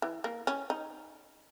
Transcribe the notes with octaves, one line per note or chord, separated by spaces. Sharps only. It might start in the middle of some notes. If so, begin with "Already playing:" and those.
E3
A#3
C#4
D#4